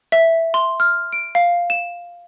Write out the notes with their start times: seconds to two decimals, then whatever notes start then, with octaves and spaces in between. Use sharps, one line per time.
0.12 E5
0.54 C6
0.80 F6
1.12 D7
1.35 F5
1.70 E7